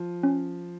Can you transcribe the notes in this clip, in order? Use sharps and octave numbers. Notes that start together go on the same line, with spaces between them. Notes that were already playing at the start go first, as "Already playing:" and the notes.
Already playing: F3
C#4